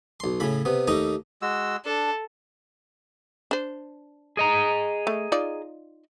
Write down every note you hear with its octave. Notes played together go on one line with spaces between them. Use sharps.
B1 C6
A2 C#3 B5
C3 B3
D#2 A3 D#4 A#5 D#6
G#3 F#4 E6
D4 A4
D4 C5
G#4 D#5 A#5
A3
D#4 F4 D5